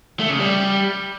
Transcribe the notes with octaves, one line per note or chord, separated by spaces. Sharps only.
A3
C#3
G3